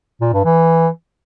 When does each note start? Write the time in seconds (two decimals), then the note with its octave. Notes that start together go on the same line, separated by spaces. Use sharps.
0.21 A#2
0.33 G2
0.45 E3